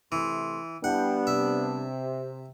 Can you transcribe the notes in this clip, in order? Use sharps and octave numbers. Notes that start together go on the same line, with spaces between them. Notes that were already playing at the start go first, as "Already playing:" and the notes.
C3 E3 A3 C6
G3 B3 D4 E4 F#5 G5
C3 E5